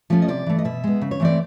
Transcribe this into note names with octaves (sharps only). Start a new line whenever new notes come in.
F3 A3 C#4
D#5
C3 D5
E3 A3
D#5
B2 E5
G#3 B3
C#3
C#5
E3 A3 C4 D5